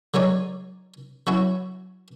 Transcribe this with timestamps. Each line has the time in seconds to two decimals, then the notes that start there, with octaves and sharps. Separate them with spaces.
0.14 F#3 G#3 D#4 C#5 D5
1.27 F#3 C#4 E4 F#4